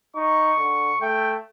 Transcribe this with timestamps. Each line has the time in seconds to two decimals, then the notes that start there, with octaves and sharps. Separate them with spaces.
0.16 D#4 C#6
0.59 D3
1.01 A3 G5